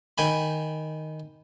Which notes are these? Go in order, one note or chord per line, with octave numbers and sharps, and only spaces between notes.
D#3 G5 G#5 B5